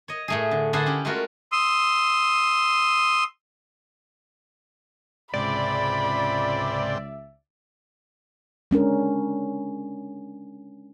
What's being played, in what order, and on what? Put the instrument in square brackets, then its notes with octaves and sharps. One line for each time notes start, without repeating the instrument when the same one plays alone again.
[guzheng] C#5 D#5
A2 A3 G#4
D3
D3 D4 E4 G#4 A4 C5
C#4 G4
G#3 A3 F4 F#4 A#4
[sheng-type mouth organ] C6 D#6 E6
[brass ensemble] C#2 E5 [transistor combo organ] G#2 C3 G5 [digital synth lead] D5 [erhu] B5
[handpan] G#3 C#4 D4 A#4